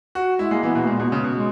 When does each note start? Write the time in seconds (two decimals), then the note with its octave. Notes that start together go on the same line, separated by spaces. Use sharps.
0.15 F#4
0.39 G#3 E4
0.51 G#3 A#3
0.63 E3 B3
0.75 B2 B3
0.87 A#2 G#3
0.99 B2
1.12 C#3
1.24 B2
1.36 G#3